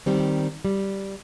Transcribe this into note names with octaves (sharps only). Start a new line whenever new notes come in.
D#3 G3 C4
G3